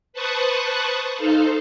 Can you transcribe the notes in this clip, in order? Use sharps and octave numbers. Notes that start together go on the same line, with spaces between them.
B4 C5 A5 C#6 D#6 F#6
D#4 A4 C5 F5